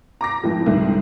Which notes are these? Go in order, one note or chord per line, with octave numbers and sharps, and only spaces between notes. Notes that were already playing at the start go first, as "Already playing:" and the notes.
A#5 D6 A#6
F2 G#2 E3 F3
C2 G#2 D3 G3